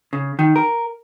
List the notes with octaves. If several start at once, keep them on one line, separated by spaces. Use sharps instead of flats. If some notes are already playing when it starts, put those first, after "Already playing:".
C#3
D#3
A#4